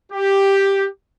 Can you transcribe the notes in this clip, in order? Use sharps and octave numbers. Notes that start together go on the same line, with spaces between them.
G4